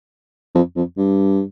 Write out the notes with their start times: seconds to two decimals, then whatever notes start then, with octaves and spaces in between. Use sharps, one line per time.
0.55 F2
0.76 F2
0.97 G2